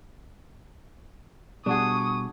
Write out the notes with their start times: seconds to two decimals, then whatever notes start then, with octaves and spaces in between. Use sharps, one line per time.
1.66 B2 G3 D4 F#4 G#4 C#6 D#6